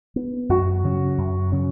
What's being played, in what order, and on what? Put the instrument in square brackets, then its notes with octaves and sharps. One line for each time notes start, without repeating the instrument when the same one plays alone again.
[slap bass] B3
[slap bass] F#2 [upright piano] F#4
[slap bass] C#3 F#3 C#4
F#2
C#3 F#3 C#4